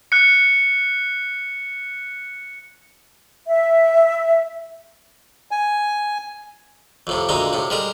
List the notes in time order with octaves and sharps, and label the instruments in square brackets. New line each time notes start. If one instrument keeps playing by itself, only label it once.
[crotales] F#6 C#7
[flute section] E5
[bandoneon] G#5
[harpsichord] F2 A2 C3
D2 A#2 G#3 D#4
A2 C3
G3 G#3 A#4